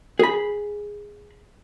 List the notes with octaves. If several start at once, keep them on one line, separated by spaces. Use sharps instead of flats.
G#4 B5